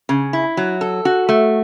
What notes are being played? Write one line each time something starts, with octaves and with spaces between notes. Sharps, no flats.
C#3
E4
F#3
A4
F#4
A3